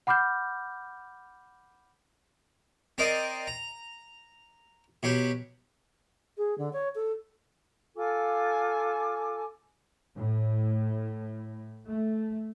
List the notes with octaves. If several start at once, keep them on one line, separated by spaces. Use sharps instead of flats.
F#5 B5 D6 F6 G6
C4 A#4 C5 D5 D#5
A#5
B2 F#3 G4
G#4
D3
C#5
A4
F4 A4 G#5 D6
A2
A3